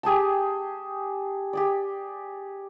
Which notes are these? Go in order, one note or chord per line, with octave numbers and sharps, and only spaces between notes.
G4 G#4 G5 A5
G4 G#4 D5